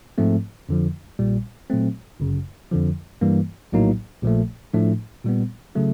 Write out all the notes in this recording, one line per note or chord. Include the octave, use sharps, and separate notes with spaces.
G#2 F3 A3 C4
F2 D3 F3
A#1 A#2 G3
A#2 F#3 A3 C4
G1 F#2 C#3
F2 D3 F3
G2 E3 G3 A#3
A#1 A2 F#3 A#3 D#4
A#1 A#2 F3 A3
A2 F3 A3 D4
A#2 G3 B3
C#3 F#3 A3